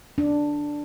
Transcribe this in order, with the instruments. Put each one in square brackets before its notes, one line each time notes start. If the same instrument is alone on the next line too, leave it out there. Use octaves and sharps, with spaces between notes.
[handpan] D4